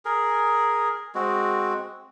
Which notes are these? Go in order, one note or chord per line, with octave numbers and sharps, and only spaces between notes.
G#4 A#4
G#3 C4 F#4